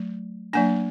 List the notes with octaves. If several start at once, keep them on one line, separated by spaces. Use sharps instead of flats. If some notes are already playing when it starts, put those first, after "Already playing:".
Already playing: F#3 A3
F#3 A#3 D4 G#5